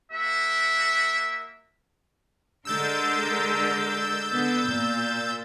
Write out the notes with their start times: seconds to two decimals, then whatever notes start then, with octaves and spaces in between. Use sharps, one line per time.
0.11 A#3 F#4 E5
2.65 D3 G#3 A#4 E6 G6 A6
4.33 D3 B3
4.66 A#2